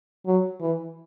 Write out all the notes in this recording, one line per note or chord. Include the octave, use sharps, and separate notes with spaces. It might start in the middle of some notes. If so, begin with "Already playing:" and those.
F#3
E3